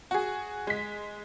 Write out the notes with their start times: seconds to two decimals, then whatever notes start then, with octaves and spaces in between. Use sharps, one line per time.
0.11 F#4 G#4
0.67 G#3 B6